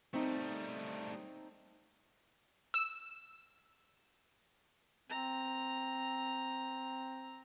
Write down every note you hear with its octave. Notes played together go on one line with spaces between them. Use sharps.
G3 A3 C4 D#4
E6
C4 A#5